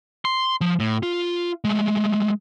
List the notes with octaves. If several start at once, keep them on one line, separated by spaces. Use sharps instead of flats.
C6
F3
A2
F4
G#3 A3